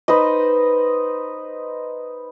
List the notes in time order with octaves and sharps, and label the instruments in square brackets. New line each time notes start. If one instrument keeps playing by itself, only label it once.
[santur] D#4 B4 C5 D#5